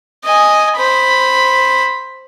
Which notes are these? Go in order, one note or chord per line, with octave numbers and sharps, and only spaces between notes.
D#5 G#5
C5 B5